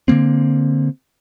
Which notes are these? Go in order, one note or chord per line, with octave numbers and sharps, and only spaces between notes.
D3 D#3 A#3 C4